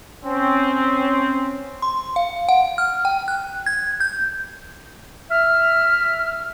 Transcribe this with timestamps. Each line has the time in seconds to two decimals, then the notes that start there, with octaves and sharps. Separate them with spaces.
0.24 C4 C#4
1.82 C6
2.16 F5
2.49 F#5
2.78 F6
3.05 G5
3.28 F#6
3.66 G#6
4.00 G6
5.30 E5 F6